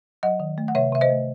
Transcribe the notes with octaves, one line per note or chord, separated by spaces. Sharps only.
F#3 D#5 F#5
D#3
A3
F#5
C3 C#5 E5
C3 E5
C5 D#5
A3